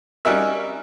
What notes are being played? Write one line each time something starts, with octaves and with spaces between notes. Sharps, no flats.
G3 C#4 D#4 F#4 A#4 E5